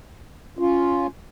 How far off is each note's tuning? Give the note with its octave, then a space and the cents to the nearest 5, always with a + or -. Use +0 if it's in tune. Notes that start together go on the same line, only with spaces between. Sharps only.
C#4 +10 F4 +0